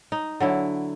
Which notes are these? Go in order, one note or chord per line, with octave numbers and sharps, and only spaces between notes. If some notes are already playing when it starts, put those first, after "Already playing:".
D#4
D3 F#3 E4